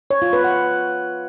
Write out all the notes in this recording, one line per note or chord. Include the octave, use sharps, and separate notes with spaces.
C#5
F4
B4
F#5